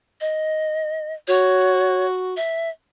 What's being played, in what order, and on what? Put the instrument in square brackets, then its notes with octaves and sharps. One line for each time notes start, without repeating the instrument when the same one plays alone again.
[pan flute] D#5
[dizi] F#4 [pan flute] C#5
[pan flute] E5